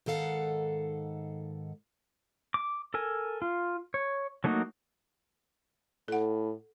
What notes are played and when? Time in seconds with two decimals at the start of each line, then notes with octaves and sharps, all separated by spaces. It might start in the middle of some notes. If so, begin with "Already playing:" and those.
0.06 G#2 D#3 A4 F5 F#5
2.54 D6
2.94 A4 A#4 G#5
3.42 F4
3.94 C#5
4.44 F#3 A3 A#3 D#4 F#4
6.08 A2 A4 F#5